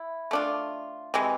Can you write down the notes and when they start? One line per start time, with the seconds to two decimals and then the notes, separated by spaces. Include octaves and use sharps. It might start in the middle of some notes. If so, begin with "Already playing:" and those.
Already playing: E4
0.31 A3 D4 F4
1.14 C3 E3 G#3